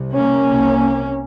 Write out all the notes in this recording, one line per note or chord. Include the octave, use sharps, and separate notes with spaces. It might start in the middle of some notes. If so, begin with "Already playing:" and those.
Already playing: C2 C3
A#3 C#4
C2 C3